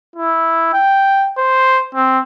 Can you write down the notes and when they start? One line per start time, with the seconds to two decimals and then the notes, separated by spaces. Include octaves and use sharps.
0.16 E4
0.73 G5
1.38 C5
1.95 C4